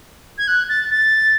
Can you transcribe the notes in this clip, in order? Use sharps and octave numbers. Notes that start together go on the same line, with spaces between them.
G#6
F#6
A6
A6